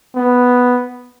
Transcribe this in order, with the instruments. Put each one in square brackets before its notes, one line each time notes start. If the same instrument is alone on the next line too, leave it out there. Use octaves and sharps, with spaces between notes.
[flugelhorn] B3